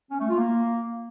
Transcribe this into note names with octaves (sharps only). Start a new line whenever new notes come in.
C#4
A3
F4
A#3